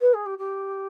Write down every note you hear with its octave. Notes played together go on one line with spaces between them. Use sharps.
B4
G#4
G4
G4